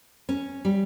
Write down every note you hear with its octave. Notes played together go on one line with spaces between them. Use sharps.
C#4
G3